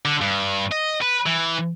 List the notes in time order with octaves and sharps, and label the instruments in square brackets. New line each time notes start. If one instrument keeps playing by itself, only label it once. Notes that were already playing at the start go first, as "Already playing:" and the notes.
[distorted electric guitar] D3
G2
D#5
B4
E3